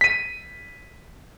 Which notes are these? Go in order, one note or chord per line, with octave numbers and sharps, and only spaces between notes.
B6 D#7